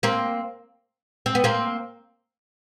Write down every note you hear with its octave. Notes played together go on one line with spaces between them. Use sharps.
A#3 C4
C4
B3
A#3 C4